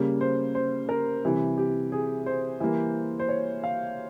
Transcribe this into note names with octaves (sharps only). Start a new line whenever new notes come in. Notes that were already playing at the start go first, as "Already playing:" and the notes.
Already playing: C#3 G3 A#3
C5
C5
A#4
C3 E3 G3
G4
G#4
C5
E3 G3 A#3
C5
C#5
F5